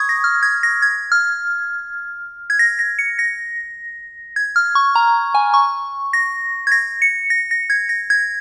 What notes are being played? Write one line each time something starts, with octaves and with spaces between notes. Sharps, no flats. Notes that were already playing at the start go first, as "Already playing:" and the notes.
Already playing: C#6 D#6 G#6
A#6
F6
G#6
A#6
G#6
F6
G#6
A#6
A#6
C#7
A#6
G#6
F6
C#6
A#5
G#5
C#6
A#6
G#6
A#6
C#7
A#6
A#6
G#6
A#6
G#6